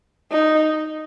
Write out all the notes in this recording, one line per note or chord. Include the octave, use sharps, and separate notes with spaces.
D#4